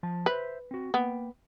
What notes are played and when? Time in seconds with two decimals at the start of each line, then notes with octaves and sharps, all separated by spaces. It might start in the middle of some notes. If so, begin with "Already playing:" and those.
0.03 F3 A5
0.26 B4 C5 E5
0.71 C4 F#4
0.94 A#3 B3 G5